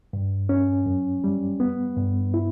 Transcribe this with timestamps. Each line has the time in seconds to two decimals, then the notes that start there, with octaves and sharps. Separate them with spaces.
0.13 G2
0.49 C#4
0.86 F#2
1.24 G3
1.60 B3
1.97 G2
2.34 E4